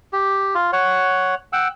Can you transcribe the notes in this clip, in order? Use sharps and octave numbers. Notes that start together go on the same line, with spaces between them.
G4
F4
C#5 F#5
F#5 G5 E6